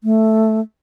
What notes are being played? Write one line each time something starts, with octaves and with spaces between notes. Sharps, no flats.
A3